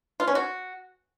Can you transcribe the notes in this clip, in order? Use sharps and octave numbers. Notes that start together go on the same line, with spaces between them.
F4
C#4
F#4